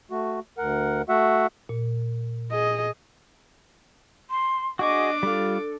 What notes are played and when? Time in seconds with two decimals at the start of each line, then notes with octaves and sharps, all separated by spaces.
0.11 A3 F#4
0.58 D2 A#4 F#5
1.09 A3 F#4 E5 F#5
1.69 A#2
2.51 G#4 D#5
4.29 C6
4.79 D4 F#4 G#4 D#5 C#6 D6
5.23 G3 F4 A4